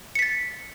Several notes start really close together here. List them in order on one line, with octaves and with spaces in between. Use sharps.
C#7 B6 A6